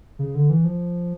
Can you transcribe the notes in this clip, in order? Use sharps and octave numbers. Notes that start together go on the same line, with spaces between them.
C#3
D3
E3
F3